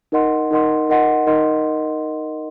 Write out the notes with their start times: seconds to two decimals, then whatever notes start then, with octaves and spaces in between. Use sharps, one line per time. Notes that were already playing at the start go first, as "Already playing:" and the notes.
0.12 D#4 A#4 D#5 F#5 C6
0.51 D#4 A#4 D#5 F#5 C6
0.89 D#4 A#4 D#5 F#5 C6
1.27 D#4 A#4 D#5 F#5 C6